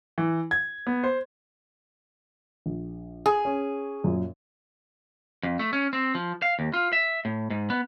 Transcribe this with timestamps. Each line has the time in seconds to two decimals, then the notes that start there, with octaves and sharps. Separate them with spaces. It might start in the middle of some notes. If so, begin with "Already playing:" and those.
0.18 E3
0.51 G#6
0.87 B3
1.04 C5
2.66 A#1
3.26 G#4
3.45 C#4
4.04 F#2 A#2
5.43 F2
5.59 A3
5.73 C#4
5.93 C4
6.15 F3
6.42 F5
6.59 D#2
6.73 F4
6.93 E5
7.25 A2
7.50 G#2
7.70 B3